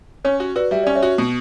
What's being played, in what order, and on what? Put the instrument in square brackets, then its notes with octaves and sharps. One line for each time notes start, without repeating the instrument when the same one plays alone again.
[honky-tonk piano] C#4 [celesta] C#5
[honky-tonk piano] F#4
[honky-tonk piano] F#4 [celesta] B4 D5
[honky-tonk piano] G3 [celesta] E5
[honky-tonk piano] C#4 [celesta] D5
[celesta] C#5 E5
[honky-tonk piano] F#4
B2